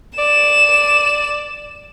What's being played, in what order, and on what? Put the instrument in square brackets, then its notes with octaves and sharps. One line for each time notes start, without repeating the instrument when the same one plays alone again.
[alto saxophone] D5 [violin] E7